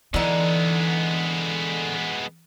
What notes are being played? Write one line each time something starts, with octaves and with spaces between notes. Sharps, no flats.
D3 E3 G#3 B3 D#4